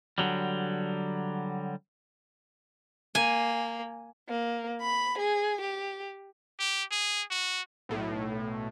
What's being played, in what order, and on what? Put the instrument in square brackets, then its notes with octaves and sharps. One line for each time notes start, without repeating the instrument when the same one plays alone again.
[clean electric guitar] D3 F#3 G3
[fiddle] A#3 [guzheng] G#5
[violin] A#3
B5
G#4
G4
[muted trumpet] G4
G#4
F#4
[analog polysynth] B1 A2